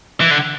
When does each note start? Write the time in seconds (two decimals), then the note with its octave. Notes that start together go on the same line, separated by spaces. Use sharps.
0.21 E3
0.31 D3